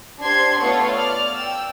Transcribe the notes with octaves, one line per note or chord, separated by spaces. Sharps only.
D4 G4 C5 C6 G#6 C7
A3 B3 F4 A4 C#5 C#6
D5 F6
G5 E6